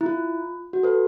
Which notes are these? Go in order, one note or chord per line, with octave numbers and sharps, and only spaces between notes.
E4
F4
F#4
A4 B4